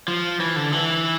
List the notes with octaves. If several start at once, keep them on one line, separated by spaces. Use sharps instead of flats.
F3
E3
D3
E3